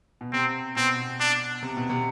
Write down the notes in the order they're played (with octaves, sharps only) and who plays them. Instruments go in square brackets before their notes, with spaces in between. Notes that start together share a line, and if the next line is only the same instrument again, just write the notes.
[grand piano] B2
[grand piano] C3 [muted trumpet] C4
[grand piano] B2 [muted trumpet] C4
[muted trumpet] D4
[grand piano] C3
B2
C3